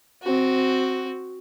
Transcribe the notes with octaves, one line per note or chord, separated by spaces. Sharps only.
C4 F#4